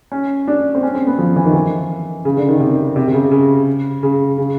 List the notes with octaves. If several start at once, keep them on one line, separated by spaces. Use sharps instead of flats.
C#4
D4
C4
C#4
C4
B3
F3
E3
D#3
E3
C#3
D3
D#3
C3
C3
C3
C#3
C#3
C#3
C#3